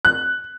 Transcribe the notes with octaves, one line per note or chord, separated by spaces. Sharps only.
F#6